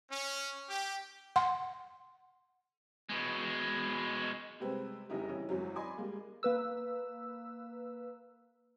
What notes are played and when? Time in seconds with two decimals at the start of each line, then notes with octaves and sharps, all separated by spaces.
0.11 C#4
0.69 G4
1.36 F#5 C6
3.09 B2 G#3
4.60 C3 G3 G#3 C4 B4
5.09 F1 C#3 G3 D#4 E4 G4
5.29 E3 G3 C#4
5.49 G#1 F#2 E3 F#3
5.76 D5 D#5 G#5 B5 C6 D6
5.97 G3 G#3 A#3
6.43 A#3 B4 E6